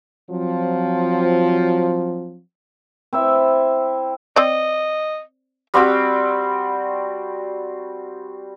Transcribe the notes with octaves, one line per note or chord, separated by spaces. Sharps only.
F3 F#3 C4
C4 E4 E5
C4 D5 D#5
G3 C4 F#4 G5